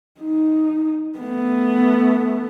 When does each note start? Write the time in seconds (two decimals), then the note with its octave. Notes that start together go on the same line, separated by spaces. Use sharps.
0.21 D#4
1.18 A3 B3